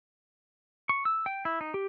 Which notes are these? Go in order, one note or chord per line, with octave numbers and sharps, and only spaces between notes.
C#6
E6
G5
E4
D#4
G4